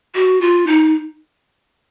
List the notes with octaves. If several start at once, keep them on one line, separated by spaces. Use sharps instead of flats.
F#4
F4
D#4